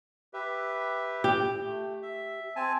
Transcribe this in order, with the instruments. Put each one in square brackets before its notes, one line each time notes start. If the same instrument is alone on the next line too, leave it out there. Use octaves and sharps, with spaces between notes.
[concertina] G4 B4 E5
[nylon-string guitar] G4
[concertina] A3
E5
C4 G#5 A5